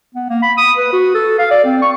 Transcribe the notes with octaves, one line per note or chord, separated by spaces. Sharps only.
B3
A#3
B5
D#6
B4
F#4
A4
F5
D5
C4
C#6